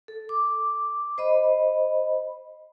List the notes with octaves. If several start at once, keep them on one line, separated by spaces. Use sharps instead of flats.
A4
D6
C5 D#5 B5